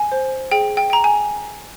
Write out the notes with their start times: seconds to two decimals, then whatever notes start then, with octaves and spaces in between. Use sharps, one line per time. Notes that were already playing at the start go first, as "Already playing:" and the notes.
Already playing: G#5
0.12 C5
0.51 G#4 G5
0.77 G5
0.90 G5 A#5
1.04 G#5